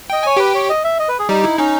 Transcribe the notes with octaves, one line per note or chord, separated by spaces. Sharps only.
D#5 G5
C#5 G#5
G4 B4 G5
C#5
D#5
E5
D#5
B4
G#4
G3 D#4 G4
E4
C#4 D#4